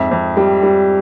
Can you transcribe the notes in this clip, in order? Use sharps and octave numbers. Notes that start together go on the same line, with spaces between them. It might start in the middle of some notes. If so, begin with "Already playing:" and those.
Already playing: F2 G#2 E5
F2
G3
G3